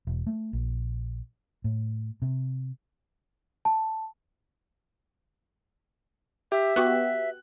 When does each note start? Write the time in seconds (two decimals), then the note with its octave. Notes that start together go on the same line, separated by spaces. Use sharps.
0.07 E1
0.26 A3
0.53 A#1
1.64 A2
2.22 C3
3.65 A5
6.52 G4 E5
6.76 B3 F#4 G4 F#6